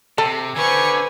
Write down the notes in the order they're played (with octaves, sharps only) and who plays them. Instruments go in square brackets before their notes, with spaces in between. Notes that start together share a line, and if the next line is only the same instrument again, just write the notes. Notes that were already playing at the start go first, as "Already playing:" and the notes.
[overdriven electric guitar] C3 [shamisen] A4
[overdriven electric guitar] D3 [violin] B4 C#6 [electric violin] C5 G#5